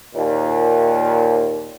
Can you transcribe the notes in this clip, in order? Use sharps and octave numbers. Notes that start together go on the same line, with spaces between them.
D#2 A#2